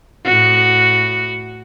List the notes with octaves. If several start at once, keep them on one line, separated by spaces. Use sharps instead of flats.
A2 F#4